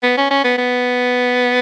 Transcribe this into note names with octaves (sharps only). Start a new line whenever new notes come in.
B3
C#4
C#4
B3
B3